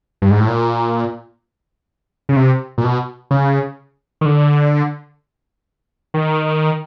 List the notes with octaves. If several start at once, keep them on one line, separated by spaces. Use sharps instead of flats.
G2
G#2
A2
A#2
C#3
C3
A#2
B2
C#3
D#3
D3
D#3